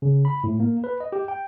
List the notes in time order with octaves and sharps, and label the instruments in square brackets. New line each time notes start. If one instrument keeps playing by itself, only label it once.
[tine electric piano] C#3
B5
A2
A#3
B4
D#5
G4
G5